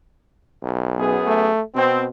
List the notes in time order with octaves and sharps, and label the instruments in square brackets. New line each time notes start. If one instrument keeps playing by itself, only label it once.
[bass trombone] B1
[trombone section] F#2 B3 G#4
[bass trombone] A3
[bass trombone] B2 [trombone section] C4